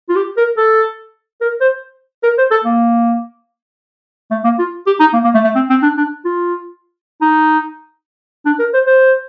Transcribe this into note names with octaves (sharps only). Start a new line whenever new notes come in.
F4
G4
A#4
A4
A#4
C5
A#4
C5
A4
A#3
A3
A#3
F4
G4
D#4
A#3
A#3
A3
A3
C4
C4
D4
D4
F4
D#4
D4
A#4
C5
C5